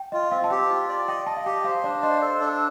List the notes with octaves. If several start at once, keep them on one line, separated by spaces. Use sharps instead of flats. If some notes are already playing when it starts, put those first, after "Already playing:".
Already playing: G5
F4 D#5
C4 F5
A5
G4 G5
F4
D5
D#5 G5
D#5 A5
F5
G4 G5
C5 F5
D4 D5
C5 D#5
A4
D4